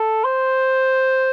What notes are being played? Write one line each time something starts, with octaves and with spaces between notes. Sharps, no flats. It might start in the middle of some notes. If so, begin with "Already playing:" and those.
Already playing: A4
C5